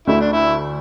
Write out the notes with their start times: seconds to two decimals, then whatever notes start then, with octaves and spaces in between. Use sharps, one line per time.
0.07 D2 D3 A3 E4
0.20 D4
0.33 E4